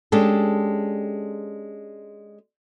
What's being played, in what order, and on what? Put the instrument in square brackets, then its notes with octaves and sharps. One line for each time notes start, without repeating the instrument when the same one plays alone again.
[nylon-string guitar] G#3 C#4 D4 G4 A4